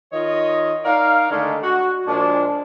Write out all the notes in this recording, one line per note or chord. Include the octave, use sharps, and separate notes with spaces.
D#3 F4 C#5 D#5
D#4 A#4 D5 F5
D3 D#3 G#3 A3 D4
F#4
A#2 F3 G#3 D4